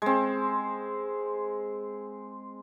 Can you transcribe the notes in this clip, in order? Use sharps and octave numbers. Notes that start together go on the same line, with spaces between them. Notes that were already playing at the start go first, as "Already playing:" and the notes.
G#3 C4